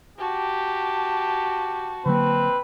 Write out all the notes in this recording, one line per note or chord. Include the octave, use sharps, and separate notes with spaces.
F#4 G4 A5
D3 F#3 A#3 C4 B4